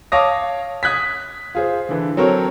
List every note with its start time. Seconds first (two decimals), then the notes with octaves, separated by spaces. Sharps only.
0.12 C#5 F5 A5 D6 D#6 A#6
0.83 D#6 F#6 G#6 B6
1.55 F4 G#4 C5
1.89 D3 E3
2.17 F#3 C4 A4 A#4 C#5